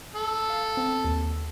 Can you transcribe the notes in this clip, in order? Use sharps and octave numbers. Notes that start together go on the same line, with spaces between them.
A4
F5
C4
D#2